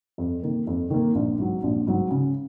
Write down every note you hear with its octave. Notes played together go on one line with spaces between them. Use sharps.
F2
D#3 A#3
F2
D#3 A#3
A#1
G#2 F#3
A#1
G#2 F#3
C#3